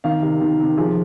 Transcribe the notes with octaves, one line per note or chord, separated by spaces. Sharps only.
D#3 F5
C3
D#3
C3
F3 G#4